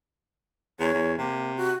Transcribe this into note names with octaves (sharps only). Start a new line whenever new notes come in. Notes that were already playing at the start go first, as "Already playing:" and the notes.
E2 C#5
E2
C3 A#3
F#4